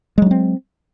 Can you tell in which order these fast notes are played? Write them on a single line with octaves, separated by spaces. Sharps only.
G#3 F#3 D4 C4